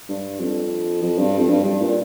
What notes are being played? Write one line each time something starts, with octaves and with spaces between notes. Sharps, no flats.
G2
F2
F2
G2
F2
G2
G2
A#2